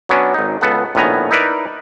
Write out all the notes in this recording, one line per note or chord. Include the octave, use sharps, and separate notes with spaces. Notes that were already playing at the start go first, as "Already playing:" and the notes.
F#3 B3 C#4 D4
G#1 D#4
C#2 B3 A4 F#5
A#1 A2 D#3 B3 G#5 A#5
D#4 E4 A#4 B4 D5